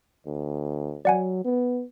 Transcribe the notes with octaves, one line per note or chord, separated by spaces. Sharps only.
D2
F#3 D5 F#5 G#5
B3